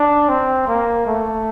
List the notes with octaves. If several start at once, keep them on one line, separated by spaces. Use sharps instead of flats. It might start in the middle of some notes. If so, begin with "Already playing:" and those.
Already playing: D4
C4
A#3
A3